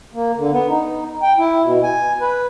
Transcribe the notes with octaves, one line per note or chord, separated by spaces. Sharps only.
A#3
D3
B3
D#4
G5
E4
B2
G#5
B4